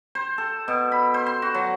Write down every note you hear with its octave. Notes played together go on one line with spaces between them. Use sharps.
C5
A4
B2
B5
C5
C6
F#4
F#3